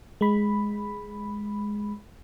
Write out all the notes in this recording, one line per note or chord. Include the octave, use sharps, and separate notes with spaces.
G#3 B5